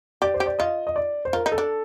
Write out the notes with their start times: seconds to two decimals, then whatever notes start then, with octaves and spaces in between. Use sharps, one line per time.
0.22 G4 D5
0.34 C5
0.40 G4
0.46 D5
0.59 F4 D#5
0.87 D#5
0.96 D5
1.25 C5
1.33 F4 A#4
1.46 D#4
1.52 A4
1.58 D4